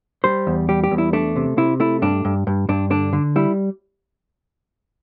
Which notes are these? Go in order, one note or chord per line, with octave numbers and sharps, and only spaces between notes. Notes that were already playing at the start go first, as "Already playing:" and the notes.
G3 C5
E2
G3 G4
G4
E2
E4
A3 D4
C3
C3 E4
A3 E4
G2 D4
G2
G2
G2 D4
D3 D4
D3
G3 E4